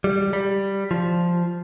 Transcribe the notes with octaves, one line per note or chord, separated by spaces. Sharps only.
G3
G3
F3